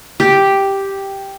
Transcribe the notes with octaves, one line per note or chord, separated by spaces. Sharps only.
G4